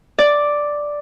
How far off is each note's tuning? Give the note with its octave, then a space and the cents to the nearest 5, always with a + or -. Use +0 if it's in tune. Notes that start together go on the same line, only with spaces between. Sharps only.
D5 +0